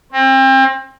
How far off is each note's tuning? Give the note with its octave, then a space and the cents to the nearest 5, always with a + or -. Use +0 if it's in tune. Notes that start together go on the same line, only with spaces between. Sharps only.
C4 +30